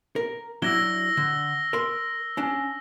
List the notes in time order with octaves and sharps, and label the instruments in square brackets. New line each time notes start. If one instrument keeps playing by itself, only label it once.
[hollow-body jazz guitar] A#4
[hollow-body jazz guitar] F#3 D4 E4 [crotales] E6 A#6 G7
[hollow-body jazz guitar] D3
A#4 C6
C#4 D4